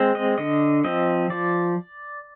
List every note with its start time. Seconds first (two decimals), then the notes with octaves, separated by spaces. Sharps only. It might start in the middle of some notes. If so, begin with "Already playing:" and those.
Already playing: G#3 C4
0.15 D#5
0.38 D3 D#5
0.84 F3 C4 D#5
1.30 F3 D5